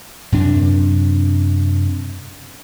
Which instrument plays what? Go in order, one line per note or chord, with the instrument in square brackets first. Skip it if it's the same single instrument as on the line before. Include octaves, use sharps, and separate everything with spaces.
[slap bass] F#2 C3 D4